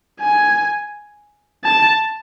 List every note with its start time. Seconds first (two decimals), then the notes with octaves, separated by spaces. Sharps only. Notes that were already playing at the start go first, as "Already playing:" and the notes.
0.21 G#5
1.64 A5